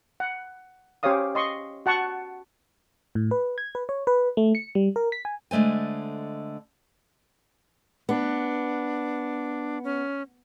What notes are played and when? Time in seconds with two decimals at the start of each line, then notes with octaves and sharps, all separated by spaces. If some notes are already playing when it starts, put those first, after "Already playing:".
0.20 F#5
1.03 C#4 G4 C5 C#5 F5 D#6
1.35 D#5 C6 C#6 D#6
1.86 F#4 F#5 A5 C#6
3.15 A2
3.31 B4
3.58 G#6
3.75 B4
3.89 C#5
4.07 B4
4.37 A3
4.55 C#7
4.75 G3
4.96 A#4
5.12 B6
5.25 G#5
5.51 D3 G#3 A3 C5 G#5
8.09 B3 D4
9.84 C#4